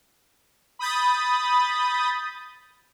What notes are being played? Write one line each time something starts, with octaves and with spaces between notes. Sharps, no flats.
B5 D#6 G6 A6